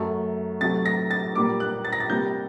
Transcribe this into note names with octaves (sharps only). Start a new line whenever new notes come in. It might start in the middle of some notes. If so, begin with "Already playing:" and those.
Already playing: F#2 F#3 A3
C3 F#3 A3 A6
A#6
A6
A#2 G3 A#3 D6
F#6
A6
A#6
A6
C3 G3 A#3 G6